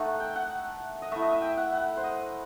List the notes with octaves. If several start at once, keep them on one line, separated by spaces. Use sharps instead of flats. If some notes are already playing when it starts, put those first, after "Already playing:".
Already playing: A3 D#4 F#5 A5
G5
F#5
D#5
A3 E4 E5
D#5
E5
G5
F#5
F#5
C5
D#5